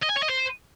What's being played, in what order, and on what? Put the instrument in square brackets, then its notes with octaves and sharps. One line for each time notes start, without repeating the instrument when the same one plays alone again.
[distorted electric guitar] D#5
G#5
C#5
D#5
C5